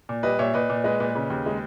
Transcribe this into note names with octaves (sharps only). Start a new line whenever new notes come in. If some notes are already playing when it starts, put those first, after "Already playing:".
A#2
G3 B4 D#5
A#2 C#5 E5
A#2 B4 D#5
A#2
G#3 B4 D#5
A#2 B4 D#5
C#3
D#2
G#3